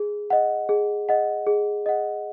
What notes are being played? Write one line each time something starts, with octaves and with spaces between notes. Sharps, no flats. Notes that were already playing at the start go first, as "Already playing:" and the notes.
Already playing: G#4
D#5 F#5
G#4
D#5 F#5
G#4
D#5 F#5